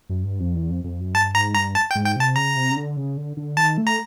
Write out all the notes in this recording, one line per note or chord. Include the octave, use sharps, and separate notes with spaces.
F#2
G2
F2
E2
F2
F2
F#2
G2 A5
G#2 A#5
G2 A#5
A5
G5
G#2
G5
C3 A5
C#3 A#5
C3
C#3
D3
C#3
D3
D3
D#3 A5
A3
A#5